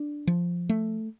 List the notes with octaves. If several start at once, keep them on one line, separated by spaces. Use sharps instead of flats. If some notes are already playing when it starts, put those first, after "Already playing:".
Already playing: D4
F3
A3